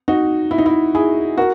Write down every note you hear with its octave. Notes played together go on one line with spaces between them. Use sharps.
D#4 F#4
E4
D#4
E4
E4 G#4
F#4 A#4